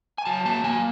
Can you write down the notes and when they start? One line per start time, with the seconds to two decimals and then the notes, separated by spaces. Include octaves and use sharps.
0.18 G#5
0.25 F#3 A5
0.45 A#3 A5
0.64 A#3 G#5